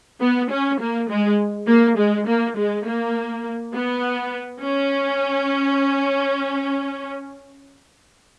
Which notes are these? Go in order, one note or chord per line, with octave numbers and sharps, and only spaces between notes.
B3
C#4
A#3
G#3
A#3
G#3
A#3
G#3
A#3
B3
C#4